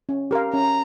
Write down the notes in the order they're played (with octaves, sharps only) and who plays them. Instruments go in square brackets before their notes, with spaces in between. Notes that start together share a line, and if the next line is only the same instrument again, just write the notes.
[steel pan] C#4
G4 A#4 F5
[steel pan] C#4 [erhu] A#5